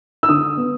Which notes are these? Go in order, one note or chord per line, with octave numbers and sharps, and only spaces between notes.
E6
D3 D#6
B3